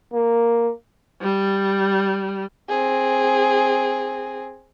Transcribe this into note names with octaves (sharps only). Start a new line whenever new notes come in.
A#3
G3
C4 G#4